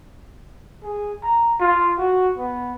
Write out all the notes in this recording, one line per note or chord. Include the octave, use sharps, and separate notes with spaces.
G#4
A#5
F4
F#4
B3